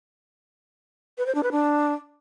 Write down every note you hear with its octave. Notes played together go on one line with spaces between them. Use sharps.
B4
C5
D4
B4
D4